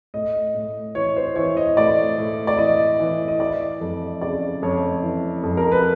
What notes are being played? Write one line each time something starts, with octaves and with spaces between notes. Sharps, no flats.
A2 D#5
A2
E3 C#5
C5
E3 C#5
D#5
A2 D5
A2
D5
E3 D#5
E3
D#5
E3 D5
F2
C#3 D5
F2 C#5
E3
F2
A#4
B4